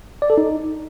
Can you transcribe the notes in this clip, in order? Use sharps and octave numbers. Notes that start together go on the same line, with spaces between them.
D5
A4
D#4